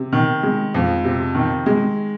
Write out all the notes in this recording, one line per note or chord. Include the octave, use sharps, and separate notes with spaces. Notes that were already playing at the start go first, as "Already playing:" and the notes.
Already playing: C3
D#3
G#3
F2
C3
D#3
G#3